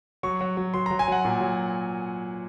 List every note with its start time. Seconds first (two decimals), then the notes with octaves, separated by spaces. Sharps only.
0.23 F#3 C#6
0.41 F#3
0.57 F#3
0.74 F#3 C6
0.86 A#5
0.91 F#3
0.99 G#5
1.08 F#3 F#5
1.25 A#2
1.41 F#3